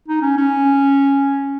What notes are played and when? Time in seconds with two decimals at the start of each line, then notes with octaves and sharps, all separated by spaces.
0.08 D#4
0.22 C#4
0.37 C#4